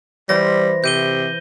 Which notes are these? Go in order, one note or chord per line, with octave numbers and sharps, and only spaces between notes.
E3 G3 C5 A#6
C3 G6 D#7 G7